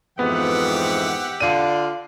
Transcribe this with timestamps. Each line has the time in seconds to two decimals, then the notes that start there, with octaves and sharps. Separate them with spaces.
0.19 F2 G#2 E3 B3 G4 E5 F#5
1.40 D3 F4 D5 D#7